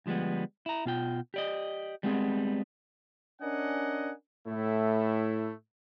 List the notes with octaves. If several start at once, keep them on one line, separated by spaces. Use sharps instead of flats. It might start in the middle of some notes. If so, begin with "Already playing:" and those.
D2 F3 G3 G#3 B3
E4 A#5
B2 F4 G5
G4 D5 D#5
G3 G#3 B3 C4 F4 G#4
C#4 D4 A#4 D#5 F#5 G#5
A2 A3 E4